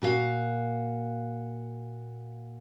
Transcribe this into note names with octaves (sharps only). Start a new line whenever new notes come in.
A#2 F#4 C#5 F5